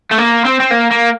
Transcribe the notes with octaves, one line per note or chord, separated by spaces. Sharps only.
A3
A#3
C4
C4
A#3
A#3